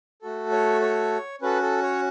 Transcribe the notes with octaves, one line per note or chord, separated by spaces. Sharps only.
A3 F#4 A4
C#5
C#5
C#4 F#4 A4 B4
A4
C#5